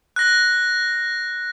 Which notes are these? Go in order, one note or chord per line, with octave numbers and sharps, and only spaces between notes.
F#6 A#6